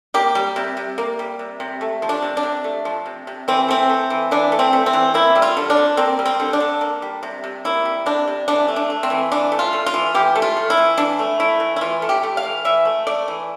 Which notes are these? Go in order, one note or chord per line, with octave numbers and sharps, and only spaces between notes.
A#3 G4
G3
C3
C3
A#3
G3
C3
C3
A3
F3
D4
C3
D4
C3
A3
F3
C3
C3
E3 C4
A3 C4
A3
E3
E3 D4
A3
C4
A3
C4
E3
A#3 E4
G3
F4
D3
D4
D3
A#3 C4
G3
C4
D3
D4
D3
A#3
G3
C3
C3
A#3 E4
G3
C3 D4
C3
E3 D4
A3
D4
A3
C4
E3
E3 D4
A3
F4
A3
F4
E3
E3 G4
A3
F4
A3
E4
E3
E3 D4
A3
A3 E4
E3
E4
E3 F4
A3
G4
A3
F5
E3
E3 E5
A3
A3 D5
E3